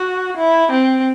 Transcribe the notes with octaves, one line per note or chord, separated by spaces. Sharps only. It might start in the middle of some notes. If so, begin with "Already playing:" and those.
Already playing: F#4
E4
C4